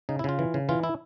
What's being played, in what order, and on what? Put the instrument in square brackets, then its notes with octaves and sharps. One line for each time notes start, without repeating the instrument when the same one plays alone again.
[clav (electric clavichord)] C#3 D#4
E4
C#3 F4
E3
C#3
E3 F4
E4